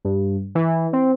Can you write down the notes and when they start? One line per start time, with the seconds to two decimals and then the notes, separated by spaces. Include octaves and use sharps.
0.05 G2
0.55 E3
0.93 C4